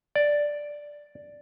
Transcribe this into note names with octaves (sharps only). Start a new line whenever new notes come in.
D5